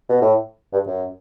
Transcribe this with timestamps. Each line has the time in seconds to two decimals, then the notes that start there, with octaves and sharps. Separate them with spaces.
0.09 B2
0.22 A2
0.73 G2
0.87 F#2